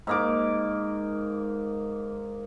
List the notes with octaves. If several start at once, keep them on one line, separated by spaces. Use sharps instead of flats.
G#2 A#3 D6